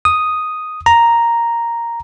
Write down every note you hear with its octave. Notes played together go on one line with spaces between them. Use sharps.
D#6
A#5